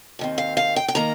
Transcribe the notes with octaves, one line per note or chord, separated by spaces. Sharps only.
D#2 D#3 C4
F5
F5
G5
G5
D#3 A#3 A#5